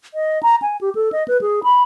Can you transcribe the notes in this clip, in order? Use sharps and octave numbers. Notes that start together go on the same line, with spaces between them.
D#5
A#5
G#5
G4
A4
D#5
B4
G#4
B5